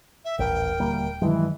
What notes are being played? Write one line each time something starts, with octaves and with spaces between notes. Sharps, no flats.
E5
D#1 A1 A#4 G5
D2 G3 A#3
G2 D#3 E3 F#3 G#3